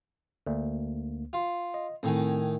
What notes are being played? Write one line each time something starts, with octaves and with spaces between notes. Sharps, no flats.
D2 A#3
F4
D#5
A2 D#3 C4 G#5